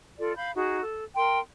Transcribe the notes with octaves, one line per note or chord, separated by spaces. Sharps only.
F4 A4 D5
F5 B5 G6
D#4 F#4 G#4
A4
A#4 G5 C6